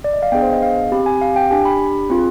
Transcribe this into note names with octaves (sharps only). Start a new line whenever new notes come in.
D5
D#5
F5
B3 D4 G#4 G5
C5
D#5
F5
C4 G4 B5
G#5
F5
G5
D4 G4 G#5
B5
C4 F4 G#4